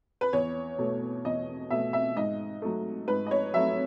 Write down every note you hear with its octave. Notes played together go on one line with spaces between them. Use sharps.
B4
E2 C#5
B2 A3
E2 D#5
B2 A3 E5
E5
G#2 D#5
F#3 A3
G#2 B4
D#5
C#5
F#3 A3 E5